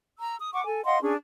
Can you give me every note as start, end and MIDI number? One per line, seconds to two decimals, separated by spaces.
0.19 0.36 82
0.19 0.36 88
0.39 0.50 87
0.53 0.64 78
0.53 0.64 85
0.53 0.64 86
0.65 0.84 69
0.65 0.84 80
0.85 1.00 75
0.85 1.00 77
0.85 1.00 78
0.85 1.00 84
1.02 1.14 61
1.02 1.14 62
1.02 1.14 68